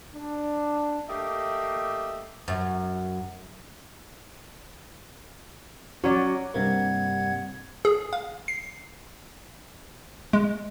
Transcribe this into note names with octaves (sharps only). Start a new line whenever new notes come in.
D4
A3 A#3 G4 D#5 E5
F#2
F#3 C#4 F#4 D5
G2 C3 G3 A#3 F#5 G#6
G#4
F5
C7
G#3